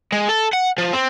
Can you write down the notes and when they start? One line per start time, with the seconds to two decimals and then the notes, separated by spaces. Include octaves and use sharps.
0.12 G#3
0.29 A4
0.53 F#5
0.78 F3
0.93 C4